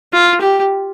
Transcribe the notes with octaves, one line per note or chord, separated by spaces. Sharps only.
F4
G4